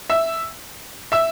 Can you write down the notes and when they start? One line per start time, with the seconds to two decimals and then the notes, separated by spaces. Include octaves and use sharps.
0.10 E5 E6
1.12 E5 E6